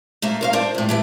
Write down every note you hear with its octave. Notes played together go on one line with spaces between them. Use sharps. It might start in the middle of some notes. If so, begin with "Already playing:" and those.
A3 A#3
A#4 C5 F5
D4 C5
E2 A2
E3 A3 G4